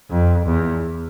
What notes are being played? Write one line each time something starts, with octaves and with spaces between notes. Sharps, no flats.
F2
E2